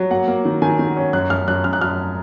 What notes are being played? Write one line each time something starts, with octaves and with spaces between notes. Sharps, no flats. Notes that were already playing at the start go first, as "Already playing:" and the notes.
Already playing: F#3
A#3 F#5
A#3
D#3
D#3 G#5
D#3
C#4
F#2 F#6
F#2 F6
F#2 F#6
F#2 F6
F#6
F#2 F6